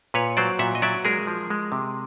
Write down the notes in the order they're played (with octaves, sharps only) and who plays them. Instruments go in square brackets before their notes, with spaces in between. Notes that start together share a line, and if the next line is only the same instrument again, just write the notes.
[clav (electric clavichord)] A#2 B4 C#5
F#3 C5 D5
A#2 E5 F#5
D#5
F#3 D5 E5
G#3 G#4 A#4
F3
G#3
C3